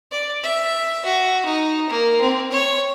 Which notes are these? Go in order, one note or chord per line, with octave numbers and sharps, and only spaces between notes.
D5
E5
F#4
D#4
A#3
C4
C#5